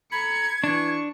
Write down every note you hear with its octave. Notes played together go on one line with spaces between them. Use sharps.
A4 A#5 B5 G#6 C#7
E3 D4 C#6